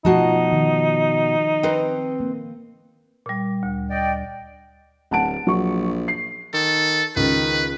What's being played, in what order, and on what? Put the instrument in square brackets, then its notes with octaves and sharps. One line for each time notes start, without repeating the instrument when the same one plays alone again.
[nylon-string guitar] B2 F#4 A5 [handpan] F3 A3 [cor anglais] D#4
[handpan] D#3
[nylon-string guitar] C4 B4
[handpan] A#3
[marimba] A#2 G3
D2
[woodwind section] D5 D#5 G5
[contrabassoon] D1 [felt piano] F#5 A5 D7
[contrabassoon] A#1 [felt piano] F#3 C#6
[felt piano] C7
[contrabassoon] D#3 [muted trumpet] A4
[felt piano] C#2 [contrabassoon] D#3 [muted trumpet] B4